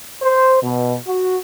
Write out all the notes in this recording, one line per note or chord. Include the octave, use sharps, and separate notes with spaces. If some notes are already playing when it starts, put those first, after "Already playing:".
C5
B2
F#4